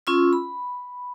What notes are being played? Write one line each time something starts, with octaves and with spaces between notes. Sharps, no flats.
C#4 F4 C6 E6
B5